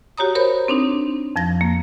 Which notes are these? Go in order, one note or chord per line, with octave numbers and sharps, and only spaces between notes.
F#4 G4 C#5 A#5 D#6
A#4 C5 C#5 B5 G6
C4 D4 D#4
F2 F3 A#6
A#3